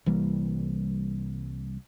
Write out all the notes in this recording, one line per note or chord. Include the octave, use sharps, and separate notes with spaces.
C2 E3 G3 A#3